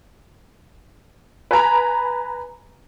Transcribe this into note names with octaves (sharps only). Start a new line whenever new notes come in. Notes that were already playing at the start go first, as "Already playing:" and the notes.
B4 G#5 A#5 B5